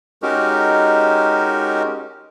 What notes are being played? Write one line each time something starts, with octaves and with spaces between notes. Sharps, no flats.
G#3 C#4 D#4 F#4 G4 A#4